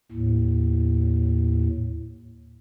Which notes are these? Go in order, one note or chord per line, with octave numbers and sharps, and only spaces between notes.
D#2 A2